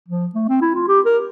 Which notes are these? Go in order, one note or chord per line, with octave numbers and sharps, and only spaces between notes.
F3
A3
C4
E4
F4
G4
A#4